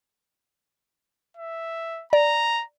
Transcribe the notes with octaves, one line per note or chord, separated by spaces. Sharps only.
E5
D5 A#5